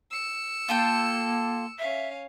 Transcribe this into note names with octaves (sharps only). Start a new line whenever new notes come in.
E6 C#7
A#3 F4 A4 G5
C#4 E5 F5